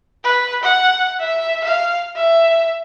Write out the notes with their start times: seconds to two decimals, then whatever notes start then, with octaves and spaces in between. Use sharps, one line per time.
0.24 B4
0.63 F#5
1.20 E5
1.64 F5
2.16 E5